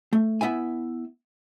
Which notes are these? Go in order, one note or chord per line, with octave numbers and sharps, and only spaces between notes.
A3
B3 E4 E5 G#5